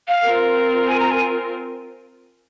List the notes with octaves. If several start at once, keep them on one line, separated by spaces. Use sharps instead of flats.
F5
C4 F4 A#4
G#5
A#5
G#5